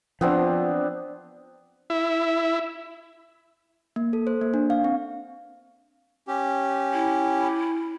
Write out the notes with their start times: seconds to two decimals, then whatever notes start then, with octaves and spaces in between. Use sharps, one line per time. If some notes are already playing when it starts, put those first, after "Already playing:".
0.21 F3 B3 C4 D4
1.90 E4
3.96 A#3
4.13 A4
4.27 C5
4.41 A#3
4.54 D4
4.70 F5
4.84 C4
6.28 C#4 G4
6.93 E4